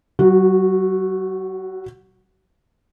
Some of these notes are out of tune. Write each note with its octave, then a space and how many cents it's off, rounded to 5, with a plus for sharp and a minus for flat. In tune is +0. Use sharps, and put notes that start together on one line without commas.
F#3 +40 F#4 -10